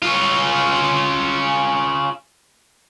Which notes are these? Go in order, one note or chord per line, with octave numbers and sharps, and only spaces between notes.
C#4 F4